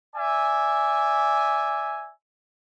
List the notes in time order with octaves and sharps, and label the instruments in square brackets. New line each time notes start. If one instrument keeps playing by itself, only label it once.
[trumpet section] D5 E5 G#5